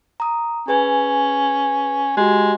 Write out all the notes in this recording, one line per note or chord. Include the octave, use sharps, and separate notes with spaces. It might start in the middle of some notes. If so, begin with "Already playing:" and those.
A#5 D#6
C#4 G#4 B4 G#5
G#3 F#4 G4